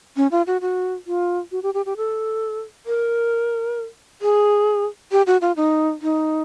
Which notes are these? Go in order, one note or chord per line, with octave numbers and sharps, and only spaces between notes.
C#4
F4
F#4
F#4
F4
F#4
G4
G4
G4
A4
A#4
G#4
G4
F#4
F4
D#4
D#4